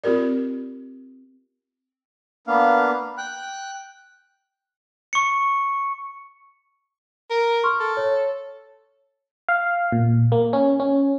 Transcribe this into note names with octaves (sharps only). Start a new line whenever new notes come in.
C4 F4 G4 A#4 D5
A#3 B3 D4 F5
G5 F#6
C#6 C#7
A#4
C6 C#6 F6
A4
C#5
F5
A#2
A#3
C#4
C#4